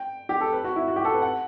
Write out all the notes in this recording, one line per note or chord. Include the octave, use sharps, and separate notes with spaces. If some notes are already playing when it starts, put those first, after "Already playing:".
Already playing: G5
G4
A4
B4
F#4
E4
F#4
G4
A4
B4
F#5